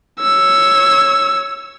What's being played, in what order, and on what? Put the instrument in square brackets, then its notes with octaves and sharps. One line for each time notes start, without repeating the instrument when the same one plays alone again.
[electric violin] C#5 E6